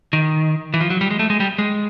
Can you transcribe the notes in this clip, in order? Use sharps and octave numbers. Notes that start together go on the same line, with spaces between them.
D#3
E3
F3
F#3
G3
G#3
A3
G#3
G3
G#3